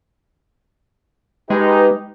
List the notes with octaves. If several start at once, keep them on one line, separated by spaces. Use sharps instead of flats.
G#3 D#4 G4 B4